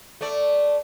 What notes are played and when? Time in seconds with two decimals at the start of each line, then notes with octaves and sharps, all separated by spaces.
0.21 A3 D5